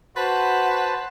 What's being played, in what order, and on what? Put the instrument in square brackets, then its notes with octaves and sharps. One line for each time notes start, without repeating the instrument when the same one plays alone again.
[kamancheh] F#4 [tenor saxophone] B4 [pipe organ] C5 A5